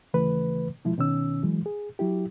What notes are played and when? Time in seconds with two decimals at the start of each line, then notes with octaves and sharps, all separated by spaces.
0.14 D#2 C#3 E3 A3 B4
0.85 B2 F3 G#3 E4
0.97 C2 B2 D#3 C#4 E6
1.43 E3 F#3 G#3
1.66 G#4
1.99 F#3 E4 G4